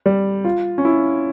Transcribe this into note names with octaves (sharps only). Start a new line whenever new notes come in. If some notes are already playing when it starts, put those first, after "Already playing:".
G3
F4
C#4
E4